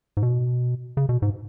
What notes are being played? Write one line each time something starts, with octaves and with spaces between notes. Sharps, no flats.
G#2
B2
C#3
B2
G#2